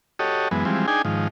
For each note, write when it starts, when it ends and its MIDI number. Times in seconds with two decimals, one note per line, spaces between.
0.19 0.48 66
0.19 0.48 67
0.19 0.48 69
0.19 0.48 73
0.19 0.48 75
0.51 0.65 42
0.51 0.65 52
0.51 0.65 56
0.51 0.65 59
0.65 0.86 52
0.65 0.86 53
0.65 0.86 55
0.65 0.86 56
0.65 0.86 60
0.88 1.02 62
0.88 1.02 63
0.88 1.02 68
0.88 1.02 79
0.88 1.02 80
1.05 1.28 44
1.05 1.28 51
1.05 1.28 53